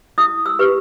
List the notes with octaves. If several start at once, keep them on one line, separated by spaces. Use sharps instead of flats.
E4 D#6
E6
G4 B4